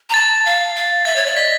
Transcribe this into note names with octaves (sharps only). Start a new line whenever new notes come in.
A#5
A5 A6
F5
F5
E5 A6
C#5
D5
D#5 B6